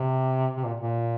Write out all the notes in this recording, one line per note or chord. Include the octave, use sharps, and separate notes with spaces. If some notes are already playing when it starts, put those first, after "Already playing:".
Already playing: C3
C3
A#2
A#2